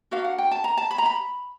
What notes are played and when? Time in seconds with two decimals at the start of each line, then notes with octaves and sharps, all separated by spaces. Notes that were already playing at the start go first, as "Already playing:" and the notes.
0.11 D4 F#4 A#4 F5
0.25 F#5
0.38 G5
0.51 A5
0.64 A#5
0.77 A5
0.91 B5
0.98 A#5
1.06 B5